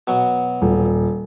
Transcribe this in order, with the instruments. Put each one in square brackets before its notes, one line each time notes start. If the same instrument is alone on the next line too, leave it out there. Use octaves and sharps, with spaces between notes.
[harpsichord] B2 F#3
[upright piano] D#1